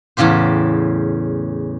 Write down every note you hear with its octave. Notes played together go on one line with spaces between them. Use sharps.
E2 A2 C#3 G4 C5